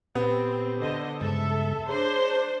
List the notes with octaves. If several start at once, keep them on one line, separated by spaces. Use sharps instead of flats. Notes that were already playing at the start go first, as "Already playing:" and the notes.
A#2 B3 C4 G4
D3 C5 D#5
G2 C#3 G#3 A4 E5
D4 G#4 C5 C#5 A#5 C6